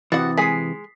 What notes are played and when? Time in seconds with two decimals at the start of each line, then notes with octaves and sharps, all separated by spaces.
0.12 C3 E3 F#4 F#5 D#6 A6
0.38 G#3 G#4 G#5 B6 C7